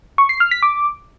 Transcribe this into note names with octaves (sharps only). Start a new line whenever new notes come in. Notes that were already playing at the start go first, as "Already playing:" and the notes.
C#6
C7
F6
B6
D6